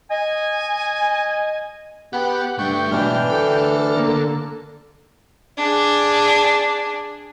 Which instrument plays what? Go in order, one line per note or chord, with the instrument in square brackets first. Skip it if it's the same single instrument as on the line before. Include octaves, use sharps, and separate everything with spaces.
[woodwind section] D#5 G#5
[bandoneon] B3 [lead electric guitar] G4 G5 [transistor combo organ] F#5
[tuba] G2 [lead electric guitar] D3 A3 [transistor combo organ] G5 [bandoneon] C#6
[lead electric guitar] B1 G#2 [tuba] B2 [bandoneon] E3 D4 F6
[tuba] D2 [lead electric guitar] A4
[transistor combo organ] D3 A#3
[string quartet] D4 G#4